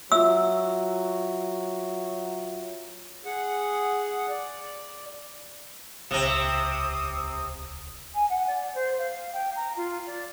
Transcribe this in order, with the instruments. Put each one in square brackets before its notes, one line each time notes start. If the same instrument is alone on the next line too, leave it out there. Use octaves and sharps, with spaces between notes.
[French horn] F#3 [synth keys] F4 E5 [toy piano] E6
[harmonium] G#4 F#5
D5
[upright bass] D#1 C#2 [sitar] C3 C4 [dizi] D#6
[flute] G#5
F#5
D5
C5
F5
G5
A#5
F4
D5